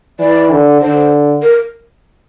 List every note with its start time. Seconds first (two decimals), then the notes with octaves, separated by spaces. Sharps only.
0.20 E3 D5
0.51 D3
0.81 D3 C5
1.42 A#4